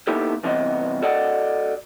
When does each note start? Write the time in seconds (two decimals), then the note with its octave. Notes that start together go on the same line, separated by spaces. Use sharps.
0.07 A#3 B3 D#4 E4 G4 A4
0.43 E2 G2 C3 E3 B3 D#5
1.02 F#4 A4 D5 D#5 F#5